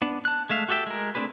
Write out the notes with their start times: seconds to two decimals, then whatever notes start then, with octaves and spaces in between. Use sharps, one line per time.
0.02 B3 D4
0.25 A5 F#6
0.50 G#3 A3 E5 F5
0.69 F#4 G4 A4 E5 G5
0.87 G#3 A#4
1.15 A3 C4 D4 G#4 B4